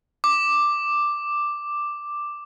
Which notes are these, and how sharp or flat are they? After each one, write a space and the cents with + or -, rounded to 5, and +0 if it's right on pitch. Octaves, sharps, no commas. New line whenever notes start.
D6 +5